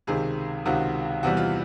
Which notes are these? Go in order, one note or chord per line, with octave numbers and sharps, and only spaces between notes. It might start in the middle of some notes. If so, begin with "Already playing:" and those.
C#2 C3 D#3 G#4
C#2 C3 D#3 F#4
E2 C3 E3 G3 F#4
F4